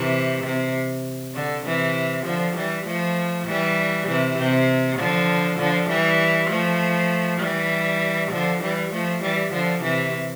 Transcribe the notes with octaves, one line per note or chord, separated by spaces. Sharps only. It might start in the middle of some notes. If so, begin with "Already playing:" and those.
Already playing: C3 E3
C3
D3
C3 E3
D3 F3
E3 G3
F3 A3
E3 G3
C3 E3
C3
D3 F3
D3 F3
E3 G3
F3 A3
E3 G3
D3 F3
E3 G3
F3 A3
E3 G3
D3 F3
C3 E3